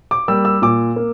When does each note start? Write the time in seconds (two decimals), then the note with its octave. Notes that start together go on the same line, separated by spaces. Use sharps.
0.11 D6
0.28 G3 A#3 E6
0.45 E6
0.62 A#2 D6
0.96 A#3